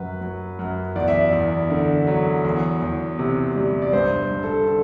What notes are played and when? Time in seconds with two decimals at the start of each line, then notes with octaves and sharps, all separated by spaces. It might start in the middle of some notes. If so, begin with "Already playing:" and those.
Already playing: F#2 F#3 B4
0.21 F#3
0.59 F#2
0.96 E2 D5
1.08 E5
1.20 D5
1.33 E2
1.70 D3
2.07 F#3
2.45 E2
2.82 E2
3.19 C3
3.56 G3
3.82 D5
3.93 G2 C5
4.31 G2
4.43 A4
4.68 D3 A4